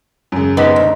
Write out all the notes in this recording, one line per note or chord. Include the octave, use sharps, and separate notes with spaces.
F#2 C#3
C3 B3 D#4
D2